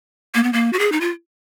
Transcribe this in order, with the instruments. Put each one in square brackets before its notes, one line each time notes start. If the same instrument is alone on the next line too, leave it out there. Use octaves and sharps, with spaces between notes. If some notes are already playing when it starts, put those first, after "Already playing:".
[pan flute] A#3
B3
A#3
F#4
G#4
D#4
F4